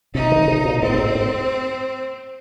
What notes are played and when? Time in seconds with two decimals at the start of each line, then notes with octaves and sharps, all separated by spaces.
0.14 C3 D#4
0.32 D#3
0.48 C3
0.65 A#2
0.81 G#2 C4
0.94 A#2
0.98 G#2
1.15 G#2